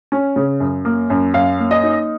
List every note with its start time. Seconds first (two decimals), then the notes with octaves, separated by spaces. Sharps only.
0.12 C#4
0.36 C#3
0.60 F#2
0.85 A#3
1.10 F#2
1.34 F#2 F5
1.59 A#3
1.71 D#5
1.83 D#4